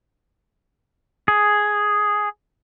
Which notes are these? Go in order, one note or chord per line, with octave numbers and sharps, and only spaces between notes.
G#4